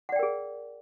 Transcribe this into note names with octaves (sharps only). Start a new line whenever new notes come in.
G#4 A#4 D5 F#5 G5